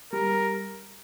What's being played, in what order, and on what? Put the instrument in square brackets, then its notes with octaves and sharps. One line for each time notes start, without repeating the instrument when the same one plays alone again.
[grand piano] G3 [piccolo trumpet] A#4